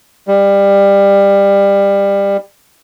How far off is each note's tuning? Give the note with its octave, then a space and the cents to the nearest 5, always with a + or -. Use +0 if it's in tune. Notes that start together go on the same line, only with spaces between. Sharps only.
G3 +20